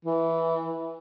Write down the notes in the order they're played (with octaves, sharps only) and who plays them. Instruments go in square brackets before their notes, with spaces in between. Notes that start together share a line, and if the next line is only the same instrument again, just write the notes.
[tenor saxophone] E3